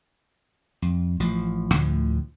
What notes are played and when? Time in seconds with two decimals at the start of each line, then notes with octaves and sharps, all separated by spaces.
0.82 F2
1.20 A1 F3
1.73 D2 A2 D3 F3